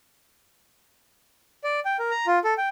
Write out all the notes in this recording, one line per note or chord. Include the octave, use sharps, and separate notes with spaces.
D5
G5
A#4
A#5
F4
A4
G5